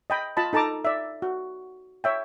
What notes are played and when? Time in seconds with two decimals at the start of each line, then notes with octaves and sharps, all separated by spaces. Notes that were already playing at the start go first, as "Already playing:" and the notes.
0.10 D#5 G5 B5
0.37 F4 D#5 A5 B5
0.53 D#4 A4 A5 A#5 D6
0.85 D5 E5
1.22 F#4
2.04 C#5 E5 G5